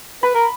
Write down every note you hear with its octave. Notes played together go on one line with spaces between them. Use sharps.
B4 B5
A#4